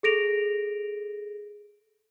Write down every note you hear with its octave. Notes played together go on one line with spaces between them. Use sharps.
G#4 A4 A#6 D7 F7